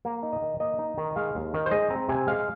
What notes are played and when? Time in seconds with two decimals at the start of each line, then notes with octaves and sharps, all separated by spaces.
0.05 A#3
0.23 D#4
0.32 D#5
0.42 D#3
0.60 A#3 D#5
0.79 D#4
0.98 D#3
1.16 G#3 F5
1.35 D#2
1.54 D#3
1.66 C5
1.71 G#3 D#5
1.90 C4 A#5
2.09 C3 G#5
2.27 G#3 F5